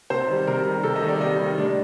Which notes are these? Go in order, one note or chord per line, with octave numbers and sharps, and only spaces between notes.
C3 C5
D#3 G3
C3 A#4
D#3 G3
C3 A4
D#5
D#3 G3
D5
C3 D#5
D#3 G3
A2 D4